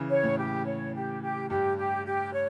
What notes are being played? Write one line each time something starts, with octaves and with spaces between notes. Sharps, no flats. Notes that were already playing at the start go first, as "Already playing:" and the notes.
Already playing: C#3 E3
C#5
A2
G4
C#5
G4
G4
G2 G4
G4
G4
C#5